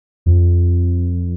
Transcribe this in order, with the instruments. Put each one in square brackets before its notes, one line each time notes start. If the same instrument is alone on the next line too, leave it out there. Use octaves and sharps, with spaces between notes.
[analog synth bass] F2